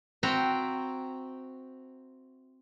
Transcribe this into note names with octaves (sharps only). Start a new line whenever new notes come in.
C4 E4 F#4 C5 G5 A#5